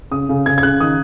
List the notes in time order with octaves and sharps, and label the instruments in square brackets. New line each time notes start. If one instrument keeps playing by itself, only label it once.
[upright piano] C#3 D#6
C#3
C#3 G#6
G#6
C#3 F#6
D#3 D#6